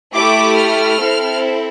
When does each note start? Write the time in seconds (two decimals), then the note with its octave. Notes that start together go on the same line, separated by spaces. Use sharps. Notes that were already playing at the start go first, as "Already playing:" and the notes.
0.14 A3 E4 G4 D6
0.56 F6
0.99 C4 E4 A4